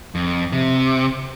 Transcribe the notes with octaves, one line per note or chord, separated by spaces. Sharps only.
F2
C3